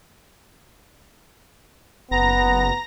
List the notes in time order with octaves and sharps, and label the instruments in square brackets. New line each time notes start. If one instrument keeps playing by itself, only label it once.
[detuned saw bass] F#1 [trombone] B3 [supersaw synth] A#5 A#6